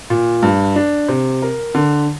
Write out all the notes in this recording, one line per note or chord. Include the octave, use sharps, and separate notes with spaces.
A#2
G2
D4
C3
A#4
D3